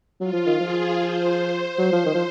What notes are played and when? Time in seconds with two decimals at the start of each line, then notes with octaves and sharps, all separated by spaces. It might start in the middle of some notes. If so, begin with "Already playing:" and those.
0.20 F#3 F4
0.33 F3
0.47 D#3
0.60 F3 G#4
1.00 C5
1.79 F#3
1.92 F3
2.06 D#3
2.15 F3